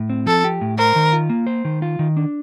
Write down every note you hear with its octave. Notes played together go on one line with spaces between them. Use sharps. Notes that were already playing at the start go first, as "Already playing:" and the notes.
Already playing: A2
C4
F3 A4
G4
A2
A#4 C5
D#3
F4
A#3
C5
D#3
F4
D#3
D4